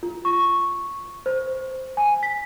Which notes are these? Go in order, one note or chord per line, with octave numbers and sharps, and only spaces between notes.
F4
C#6
C5
G#5
B6